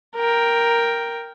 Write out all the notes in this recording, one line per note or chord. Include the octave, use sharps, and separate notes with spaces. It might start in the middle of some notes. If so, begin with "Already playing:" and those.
A#4 G5